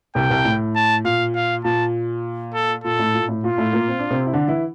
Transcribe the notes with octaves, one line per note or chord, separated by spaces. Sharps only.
C2 C3 G5
C2 C3
A2
A5
A#2 F5
F5
A#2 A5
A4
A#2 A4
A2
A#2
A2
A#2 F4
A2 A3
A#2 A#3
C4
D4
C3 C4
E4
D3 D4
E3 E4